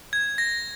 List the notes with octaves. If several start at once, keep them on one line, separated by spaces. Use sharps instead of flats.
G#6
A#6